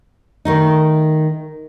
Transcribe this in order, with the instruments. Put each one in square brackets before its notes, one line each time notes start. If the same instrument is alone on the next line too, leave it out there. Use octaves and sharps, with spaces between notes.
[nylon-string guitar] D#3 A3 D#4